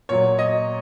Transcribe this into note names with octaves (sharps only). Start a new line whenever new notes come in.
A#2 F#3 C#5
D#5